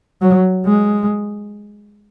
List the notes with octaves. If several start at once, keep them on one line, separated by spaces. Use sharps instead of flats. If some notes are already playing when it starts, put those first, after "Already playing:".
F#3
G#3